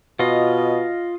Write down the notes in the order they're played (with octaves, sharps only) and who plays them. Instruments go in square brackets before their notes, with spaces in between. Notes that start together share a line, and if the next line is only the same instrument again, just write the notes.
[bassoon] B2 [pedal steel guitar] F4 D#5